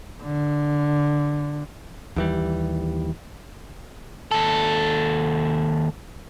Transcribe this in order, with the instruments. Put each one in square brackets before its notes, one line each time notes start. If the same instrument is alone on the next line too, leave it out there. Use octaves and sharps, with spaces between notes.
[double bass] D3
[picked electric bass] D#2 E3 G3
[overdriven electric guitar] D#2 A4